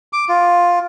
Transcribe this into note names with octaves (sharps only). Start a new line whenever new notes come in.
D6
F4